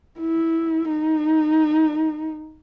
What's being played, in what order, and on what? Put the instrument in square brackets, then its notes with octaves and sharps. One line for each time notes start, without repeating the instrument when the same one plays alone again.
[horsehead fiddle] E4
D#4